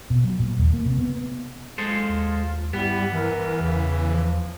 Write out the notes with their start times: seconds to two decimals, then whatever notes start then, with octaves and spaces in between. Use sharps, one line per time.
0.10 B2
0.24 F#3
0.39 A#2
0.59 D#2
0.73 A#3
0.86 C3
0.98 B3
1.78 G#3 F4 A4 C5
2.09 D#2
2.73 G2 G3 B3 E4
3.13 E3 A#4
3.60 E2 C#3
4.12 F3